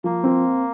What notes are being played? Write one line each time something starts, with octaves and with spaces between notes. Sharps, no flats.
F3 A#3
C4